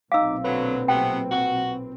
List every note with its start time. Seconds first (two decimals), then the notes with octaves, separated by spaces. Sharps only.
0.12 B1 A#2 C4 D#4 F5 D6 E6
0.44 D3 F#3 B4
0.88 C3 A3 B3 G5
1.31 F#4